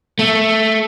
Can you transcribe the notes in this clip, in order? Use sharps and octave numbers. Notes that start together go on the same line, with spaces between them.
A3